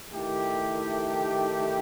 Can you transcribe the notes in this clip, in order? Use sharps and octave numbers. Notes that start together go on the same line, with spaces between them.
D#3 A3 E4 G4